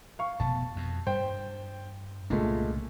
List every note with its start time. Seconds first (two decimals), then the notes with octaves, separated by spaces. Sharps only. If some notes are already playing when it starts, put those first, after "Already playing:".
0.19 F5 C#6
0.40 F1 B2 B3 A5
0.76 F2 B2
1.07 G2 G3 C5 G5
2.30 C2 A#2 C#3 G#3 A3 D4